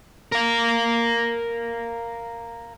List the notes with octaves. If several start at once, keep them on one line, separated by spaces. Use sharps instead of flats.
A#4 F5